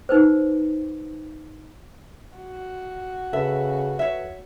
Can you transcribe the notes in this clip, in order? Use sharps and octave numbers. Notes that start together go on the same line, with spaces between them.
D#4 B4 C5
F#4
C#3 A4 B4 E5
C#5 E5